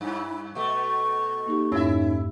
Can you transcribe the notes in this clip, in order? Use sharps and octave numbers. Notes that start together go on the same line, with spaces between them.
G2 E4
B2 A3 C#6
A#3 D#4 G4
F2 G#2 C#4 D#4 E4 E5 E6